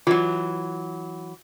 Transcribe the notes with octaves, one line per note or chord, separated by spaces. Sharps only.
E3 F#3 F4